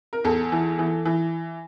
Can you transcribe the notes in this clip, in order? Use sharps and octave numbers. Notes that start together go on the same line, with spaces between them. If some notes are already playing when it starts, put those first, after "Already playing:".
A#4
E2 A4
E3
E3
E3